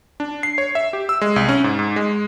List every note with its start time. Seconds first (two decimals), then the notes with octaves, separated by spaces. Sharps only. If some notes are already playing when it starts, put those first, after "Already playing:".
0.20 D4
0.43 C7
0.58 C#5
0.75 E5
0.93 G4
1.09 E6
1.21 G#3
1.36 C2
1.49 C#4
1.64 G#2
1.79 G#2
1.96 G#3